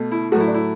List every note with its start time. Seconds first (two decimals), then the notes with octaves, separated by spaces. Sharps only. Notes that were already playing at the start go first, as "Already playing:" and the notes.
Already playing: B2 A3
0.12 E4
0.32 A2 F#3 A3 F#4
0.40 E4
0.48 D4
0.54 E4